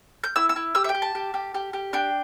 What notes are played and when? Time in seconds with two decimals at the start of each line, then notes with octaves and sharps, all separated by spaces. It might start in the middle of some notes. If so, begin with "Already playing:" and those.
0.24 G6
0.36 E4 E6
0.49 E6
0.56 E4
0.75 G4 E6
0.84 E5
0.89 G5
0.95 G4
1.02 A5
1.15 G4
1.34 G4
1.54 G4
1.73 G4
1.93 D4 G5